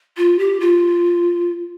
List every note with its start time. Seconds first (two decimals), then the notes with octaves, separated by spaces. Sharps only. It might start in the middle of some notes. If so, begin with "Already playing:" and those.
0.17 F4
0.39 G4
0.60 F4